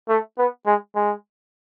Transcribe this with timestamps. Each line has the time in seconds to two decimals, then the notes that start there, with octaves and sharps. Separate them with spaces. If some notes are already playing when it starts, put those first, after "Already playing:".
0.09 A3
0.38 B3
0.66 G#3
0.95 G#3